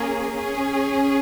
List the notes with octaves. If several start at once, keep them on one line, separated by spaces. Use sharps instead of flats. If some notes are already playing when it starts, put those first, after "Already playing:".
Already playing: A#3 C#4 G#4
C#4 G#4